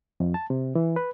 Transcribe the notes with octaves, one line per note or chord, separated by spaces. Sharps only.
F2
A5
C3
E3
B4